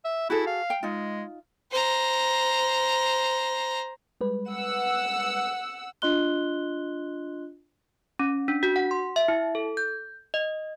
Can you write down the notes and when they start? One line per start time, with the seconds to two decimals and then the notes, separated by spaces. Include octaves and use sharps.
0.05 E5
0.30 E4 F#4 G#4 A4
0.47 F5
0.70 G5
0.83 G#3 D#4 F4
1.71 C5 A#5
4.21 G3 G#3 B4
4.51 F#5 E6
6.02 D4 F4 D#5 C6 F#6 G7
8.19 C#4
8.48 D4
8.63 F#4
8.76 F#5
8.91 C6
9.16 E5
9.28 E4
9.55 A4
9.77 G6
10.34 D#5